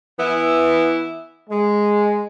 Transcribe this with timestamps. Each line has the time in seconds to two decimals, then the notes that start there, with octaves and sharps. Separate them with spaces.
0.17 E3 B3 E4
1.49 G#3